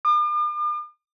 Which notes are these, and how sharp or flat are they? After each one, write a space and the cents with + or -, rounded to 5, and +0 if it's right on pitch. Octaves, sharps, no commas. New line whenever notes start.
D6 +45